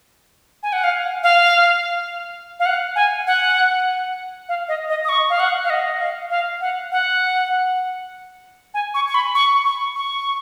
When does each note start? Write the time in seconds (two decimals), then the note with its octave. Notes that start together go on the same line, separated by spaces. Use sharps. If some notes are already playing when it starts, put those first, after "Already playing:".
0.63 G#5
0.73 F#5
0.84 F5
1.23 F5
2.59 F5
2.66 F#5
2.96 G#5
3.27 F#5
4.49 F5
4.68 D#5
4.89 D#5
5.04 D#6
5.09 C#6
5.30 F5
5.40 F#5
5.64 F5
5.70 D#5
6.00 F5
6.30 F5
6.61 F#5
6.92 F#5
8.74 G#5
8.94 C#6
9.08 C#6
9.14 B5
9.35 C#6
9.65 C#6
9.95 C#6